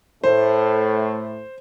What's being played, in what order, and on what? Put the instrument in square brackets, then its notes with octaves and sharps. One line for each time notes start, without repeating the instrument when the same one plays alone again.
[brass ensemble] A2 A3 [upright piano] C5